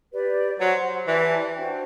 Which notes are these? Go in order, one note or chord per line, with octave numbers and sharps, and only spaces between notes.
G4 B4 D5
F#3 C5 F#5 C6
E3 G4 D5 A5
D4 F#4 C5 G5